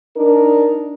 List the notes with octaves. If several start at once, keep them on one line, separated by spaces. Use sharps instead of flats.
D4 D#4 A#4